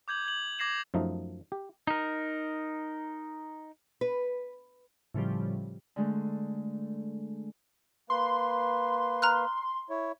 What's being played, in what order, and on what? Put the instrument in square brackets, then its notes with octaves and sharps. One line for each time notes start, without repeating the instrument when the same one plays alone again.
[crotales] D6 G6 G#6 F#7
G#6 F#7
D6 G#6 A#6 C7 E7 F#7
[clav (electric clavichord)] F#2 F3 A3 D#4
G4
[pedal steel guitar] D#4 A#4
[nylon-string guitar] B4
[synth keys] A2 C#3 F3 G3
[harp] D3 G#3 A3
[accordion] A#3 B4 [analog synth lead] C6
[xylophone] A#5 F6 F#6
[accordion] E4 C#5